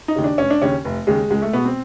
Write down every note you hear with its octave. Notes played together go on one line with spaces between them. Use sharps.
D#4
D#2 C#3
D4
F1 C#4
D4
D#2 C#3 C#4
F1
D#2 C#3 G#3
C#2 G#3
A3
B2 G#3 B3
C4